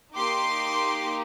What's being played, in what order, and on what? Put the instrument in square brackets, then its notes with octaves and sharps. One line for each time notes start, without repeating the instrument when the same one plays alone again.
[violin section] A#3 D#4 G4 C6 D6